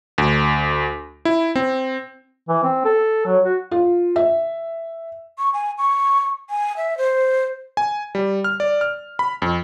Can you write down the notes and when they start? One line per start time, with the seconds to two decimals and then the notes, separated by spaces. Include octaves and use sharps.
0.18 D2
1.25 E4
1.56 C4
2.49 E3
2.64 C4
2.85 A4
3.26 F#3
3.45 F#4
3.71 F4
4.16 E5
5.38 C#6
5.54 G#5
5.78 C#6
6.50 G#5
6.77 E5
6.98 C5
7.77 G#5
8.15 G3
8.44 F6
8.60 D5
8.81 F6
9.19 B5
9.42 F2